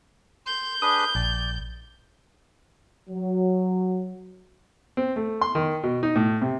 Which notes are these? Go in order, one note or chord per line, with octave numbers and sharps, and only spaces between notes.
C6 G6
D4 G#4 B4 D#6
A#1 D5
F#3
C4
A3
C6
D#3
B2
D#4
A2
C3